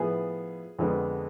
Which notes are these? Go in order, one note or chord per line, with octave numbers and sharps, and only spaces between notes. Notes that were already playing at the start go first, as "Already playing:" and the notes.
Already playing: A2 F3 B3 G#4
F2 D3 F3 G#3 B3